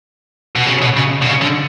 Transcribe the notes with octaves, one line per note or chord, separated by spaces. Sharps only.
B2
C#3
B2
C#3
B2
C#3
D3